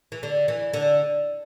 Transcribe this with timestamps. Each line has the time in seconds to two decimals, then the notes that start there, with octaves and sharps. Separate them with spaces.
0.12 E3
0.23 D3
0.48 E3
0.73 D3